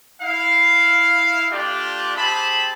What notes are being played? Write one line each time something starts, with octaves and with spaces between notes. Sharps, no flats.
E4 F5
A3 D4 F4 G4 D5
C4 G4 G#4 A5 B5